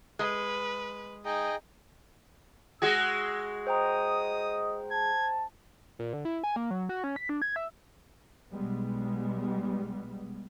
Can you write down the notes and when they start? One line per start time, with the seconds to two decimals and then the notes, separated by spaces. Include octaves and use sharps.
0.19 G#3 B4
1.25 D#4 G#4 D#5 G5
2.82 G#3 F#4 G#4 E6
3.67 C5 D#5 G5 A#5 D#6
4.91 A5 G#6
5.99 A#2
6.13 D3
6.25 E4
6.44 G#5
6.56 A#3
6.71 F#3
6.89 F#4
7.04 C#4
7.16 B6
7.29 D4
7.42 G#6
7.56 E5
8.51 B1 G3 G#3 B3